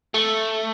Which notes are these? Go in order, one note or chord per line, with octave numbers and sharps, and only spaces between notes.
A3